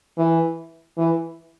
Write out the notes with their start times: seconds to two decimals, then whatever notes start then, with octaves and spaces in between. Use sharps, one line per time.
0.17 E3
0.98 E3